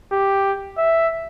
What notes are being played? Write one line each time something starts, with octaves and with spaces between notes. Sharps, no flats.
G4
E5